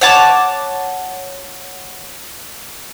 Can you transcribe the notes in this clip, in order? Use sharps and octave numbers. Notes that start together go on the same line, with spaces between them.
C#5 F#5 A5 D6